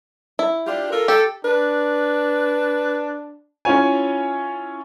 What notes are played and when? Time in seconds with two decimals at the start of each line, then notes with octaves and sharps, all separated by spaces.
0.39 E4
0.66 D4 F4 G4
0.90 F4 A4 A#4
1.08 G4 A4
1.44 D4 B4
3.65 C#4 E4 F4 C#5 G#5